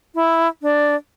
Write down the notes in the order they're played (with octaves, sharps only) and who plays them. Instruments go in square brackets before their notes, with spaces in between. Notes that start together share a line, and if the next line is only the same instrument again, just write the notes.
[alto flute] E4
D4